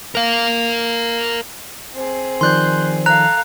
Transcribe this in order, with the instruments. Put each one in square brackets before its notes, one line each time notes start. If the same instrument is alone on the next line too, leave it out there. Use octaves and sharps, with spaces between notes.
[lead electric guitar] A#4 F5
[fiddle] C4 G#4
[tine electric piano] D#3 F3 D5 [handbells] C6 F#6 G6
[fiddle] A4 F5 [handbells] A#5 [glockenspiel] F#6